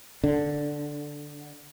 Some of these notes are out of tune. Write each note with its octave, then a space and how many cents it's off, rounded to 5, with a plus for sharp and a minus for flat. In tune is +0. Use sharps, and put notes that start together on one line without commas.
D3 +0 D4 +0